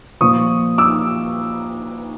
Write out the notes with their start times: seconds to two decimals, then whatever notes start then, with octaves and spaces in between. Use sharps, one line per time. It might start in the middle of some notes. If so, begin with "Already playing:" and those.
0.21 A#2 F3 C#6 D#6
0.78 D6 E6